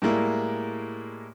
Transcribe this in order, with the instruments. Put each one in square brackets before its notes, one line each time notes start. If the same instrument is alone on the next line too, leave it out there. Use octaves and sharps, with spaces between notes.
[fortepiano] A2 G3 G#3 A#3 E4